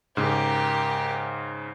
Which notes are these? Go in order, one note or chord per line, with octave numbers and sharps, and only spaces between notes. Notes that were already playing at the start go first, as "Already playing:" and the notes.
G#2 C#3 G4 A#4